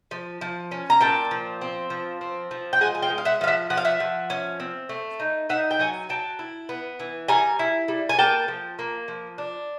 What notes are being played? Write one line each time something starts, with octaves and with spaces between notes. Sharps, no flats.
F3
F3
C#4
A#5
A#2 G5 A5
F3
C4
F3
C4
F3
G5
G#3 F#5 G#5
G#5
F5 G5
G#3
F5
E5 F#5
F3 F5
E5 F#5
F3 F#5
F5
E5 F#5
F3
C#4
C4
A3
D#4
D#4 E5 F#5
G5
F#3 F#5 G#5
F#3 G5 A5
E4
B3
E3
G3 G#5 A#5
E4
G3
G#5
A#3 G5 A5
F3
A#3
F3
D4